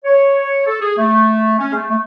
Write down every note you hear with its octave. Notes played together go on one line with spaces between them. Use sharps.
C#5
A4
G#4
A3
C#4
G#3
A3
A3